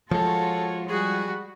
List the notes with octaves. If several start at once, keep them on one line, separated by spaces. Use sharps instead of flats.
F3 G#3 F4 F#4 A4 C#5
G3 F#4 G#4